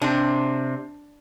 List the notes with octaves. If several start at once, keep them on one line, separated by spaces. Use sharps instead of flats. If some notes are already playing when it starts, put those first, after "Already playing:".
C3 C4 D4